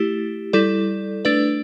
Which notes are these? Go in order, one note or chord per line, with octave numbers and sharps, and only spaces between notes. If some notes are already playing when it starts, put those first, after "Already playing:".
Already playing: A3 E4 G4
G3 E4 A4 D5
A3 D4 B4 D5